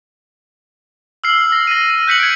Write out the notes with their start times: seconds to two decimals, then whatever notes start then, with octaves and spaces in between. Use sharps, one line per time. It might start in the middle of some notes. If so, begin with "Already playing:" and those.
1.24 E6 F6 C7 F#7
1.52 A#6
1.67 A#6 D#7
1.90 D#7
2.07 F#6 G6 B6 C#7 D#7 F#7
2.20 G#6 D7